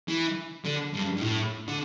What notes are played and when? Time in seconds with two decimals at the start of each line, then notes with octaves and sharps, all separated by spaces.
0.08 E3
0.65 D3
0.93 G2
1.17 G2
1.21 A2
1.68 D3